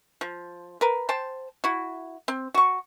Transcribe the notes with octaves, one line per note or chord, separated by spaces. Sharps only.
F3
A#4 B4
C5 G5 A5
E4 F#4
C4
F#4 C#6